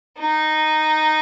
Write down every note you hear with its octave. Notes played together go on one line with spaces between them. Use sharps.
D#4